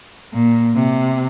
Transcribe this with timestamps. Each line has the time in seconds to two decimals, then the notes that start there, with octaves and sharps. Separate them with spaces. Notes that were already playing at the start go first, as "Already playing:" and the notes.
0.34 A#2
0.75 C3